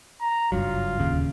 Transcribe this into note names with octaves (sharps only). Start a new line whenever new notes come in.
A#5
F#1 G2 F#3 F4
D1 D#2 C#3